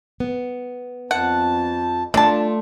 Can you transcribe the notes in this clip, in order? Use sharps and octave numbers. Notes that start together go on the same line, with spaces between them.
B3
F2 F#5 A5
A3 D4 F4 D5 A5